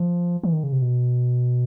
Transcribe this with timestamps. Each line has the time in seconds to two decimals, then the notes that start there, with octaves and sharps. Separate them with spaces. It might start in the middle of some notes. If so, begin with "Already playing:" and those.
Already playing: F3
0.43 E3
0.53 D#3
0.63 C#3
0.72 C3
0.82 B2